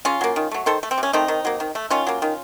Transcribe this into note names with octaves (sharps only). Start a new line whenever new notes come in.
C#3 C#4 F4
F#3 A#3
D#3
F#3 A3
D#3 A4 C5
A3
C4
C3
C#4
D#3 A3 C4 D#4
D#3
F#3 A#3
D#3
A3
D#3 C#4 F4
F#3 A#3
D#3